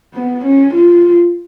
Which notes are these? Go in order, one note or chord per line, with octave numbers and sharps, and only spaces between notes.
B3
C#4
F4